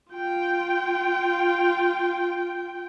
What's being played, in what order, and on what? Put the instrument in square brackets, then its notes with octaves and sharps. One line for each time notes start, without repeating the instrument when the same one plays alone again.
[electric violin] F4 G5